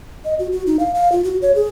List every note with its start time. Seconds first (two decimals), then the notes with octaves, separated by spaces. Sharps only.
0.25 D#5
0.39 F#4
0.52 F#4
0.67 D#4
0.79 F5
0.95 F5
1.12 F4
1.24 F#4
1.42 C#5
1.55 G#4